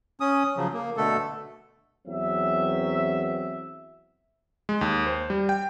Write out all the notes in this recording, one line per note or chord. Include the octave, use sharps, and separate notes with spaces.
C#4 D#6
C#3 F3 F#3
A#3
B2 D3 A3 A4
E2 F#3 C4 E5
G#3
D#2
C5
G3
G5